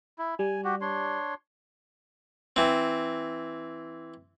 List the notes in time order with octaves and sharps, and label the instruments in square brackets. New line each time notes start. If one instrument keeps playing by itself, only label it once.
[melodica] E4
[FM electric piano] G3 [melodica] G#5
[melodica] F#4 G4
D4 C#5 C6
[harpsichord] E3 C4